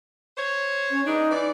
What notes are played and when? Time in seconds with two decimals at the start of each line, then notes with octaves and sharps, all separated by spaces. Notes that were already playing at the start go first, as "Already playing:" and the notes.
0.37 C5 C#5
0.91 C#4
1.05 E3 D4 D#4 G#4
1.30 E3 D5